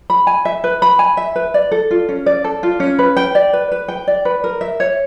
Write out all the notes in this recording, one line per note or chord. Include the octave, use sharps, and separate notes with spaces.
B5
G#5
E5
B4
B5
G#5
E5
B4
D5
A4
F4
C#4
D5
A4
F4
C#4
B4
G5
D5
B4
B4
G5
D5
B4
A#4
E5
C#5